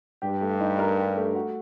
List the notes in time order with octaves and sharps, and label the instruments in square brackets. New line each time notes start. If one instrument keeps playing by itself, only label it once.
[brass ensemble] G2 [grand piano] G4
[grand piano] A3
D#4
A#4
G4
A3
F#4